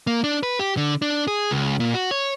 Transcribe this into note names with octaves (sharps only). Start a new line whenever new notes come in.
A#3
D4
B4
G4
D3
D4
G#4
C#2
A#2
F#4
C#5